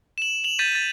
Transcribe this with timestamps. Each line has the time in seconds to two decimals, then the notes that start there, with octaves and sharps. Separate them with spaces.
0.18 E7 F#7
0.44 F7 F#7
0.59 G6 A6 B6 D#7
0.75 A6